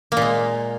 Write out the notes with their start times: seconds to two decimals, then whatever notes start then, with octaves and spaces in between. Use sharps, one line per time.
0.12 A#3
0.17 A#2
0.22 G#3